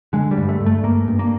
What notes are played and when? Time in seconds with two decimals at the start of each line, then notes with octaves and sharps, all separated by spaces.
0.13 D3 G#3
0.31 G3
0.37 G2
0.49 A3
0.60 G2
0.66 A3
0.84 G2 A#3
1.08 G2
1.19 A#3